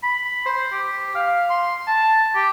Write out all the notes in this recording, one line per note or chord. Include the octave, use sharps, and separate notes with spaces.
B5
C5
G4
F5
C6
A5
G4